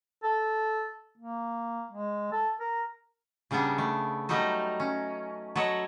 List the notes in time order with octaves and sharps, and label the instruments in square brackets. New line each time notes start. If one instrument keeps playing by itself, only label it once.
[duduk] A4
A#3
G#3
A4
A#4
[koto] C#3 G3 A#3 B3 D4
A3
F#3 G3 A3 D#4 D#5
C#4
F#3 A4 B4 C#5 D#5 E5